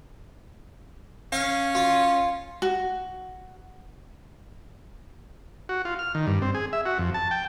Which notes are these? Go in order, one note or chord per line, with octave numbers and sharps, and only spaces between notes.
C#4 F5
F4
F#4
F#4
F4
F6
D#3
G2
C4
G#4
E5
F#4
F2
A5
G5